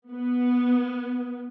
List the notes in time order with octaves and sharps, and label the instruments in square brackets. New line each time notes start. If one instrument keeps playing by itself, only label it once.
[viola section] B3